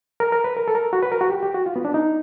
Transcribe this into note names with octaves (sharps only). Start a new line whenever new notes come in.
A#4
A#4
B4
A#4
A4
A#4
F#4
B4
A#4
F#4
G4
G4
F#4
F4
B3
D4
D#4